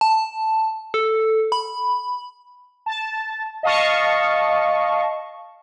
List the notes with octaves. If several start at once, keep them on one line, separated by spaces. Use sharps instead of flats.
A5
A4
B5
A5
D#5 F5 A5 C#6